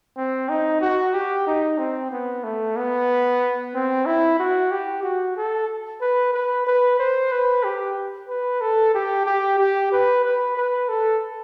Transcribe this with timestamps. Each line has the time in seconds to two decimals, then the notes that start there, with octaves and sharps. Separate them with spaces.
0.17 C4
0.49 D#4
0.81 F#4
1.14 G4
1.46 D#4
1.78 C4
2.11 B3
2.43 A3
2.76 B3
3.74 C4
4.06 E4
4.39 F#4
4.71 G4
5.03 F#4
5.37 A4
6.01 B4
6.33 B4
6.66 B4
6.99 C5
7.31 B4
7.64 G4
8.28 B4
8.61 A4
8.94 G4
9.26 G4
9.58 G4
9.92 B4
10.24 B4
10.57 B4
10.89 A4